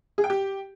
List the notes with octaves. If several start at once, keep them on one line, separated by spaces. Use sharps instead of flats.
G#4
G5
G4